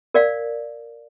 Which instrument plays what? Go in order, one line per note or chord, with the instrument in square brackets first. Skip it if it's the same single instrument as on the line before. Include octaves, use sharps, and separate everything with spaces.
[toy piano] A#4 D5 F5